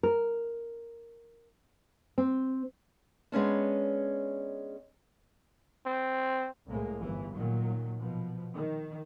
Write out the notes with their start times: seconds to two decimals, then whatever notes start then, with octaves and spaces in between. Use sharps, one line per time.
0.03 A#4
2.18 C4
3.32 G#3 B3 C#4 D4
5.86 C4
6.67 C2 A2 G#3 A#3
6.99 G1 E3
7.35 A#2 D#3 F#3
7.98 B2 F3
8.55 D#3